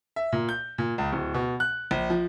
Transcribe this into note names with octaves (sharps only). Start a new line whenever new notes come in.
E5
A#2
G6
A#2
C#2
D1
B2
F#6
A#1
F3